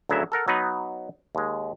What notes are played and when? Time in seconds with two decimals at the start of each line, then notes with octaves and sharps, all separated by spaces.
0.09 D2 C#3 F#3 B3 E4 E5
0.32 A4 A#4 F#5
0.48 F#3 B3 D#4 B4
1.35 D#2 G#3